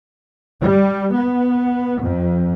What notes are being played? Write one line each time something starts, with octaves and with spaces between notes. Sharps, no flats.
G3
B3
F2